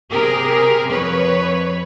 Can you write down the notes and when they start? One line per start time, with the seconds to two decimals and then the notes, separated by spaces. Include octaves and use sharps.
0.11 C3 C4 G4 G#4 A#4
0.87 F2 B4 C#5